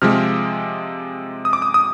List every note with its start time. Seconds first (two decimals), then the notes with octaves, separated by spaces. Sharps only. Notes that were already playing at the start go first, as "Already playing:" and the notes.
0.02 C3 F3 G#3 F6
1.45 D#6
1.53 D6
1.62 D#6
1.74 D#6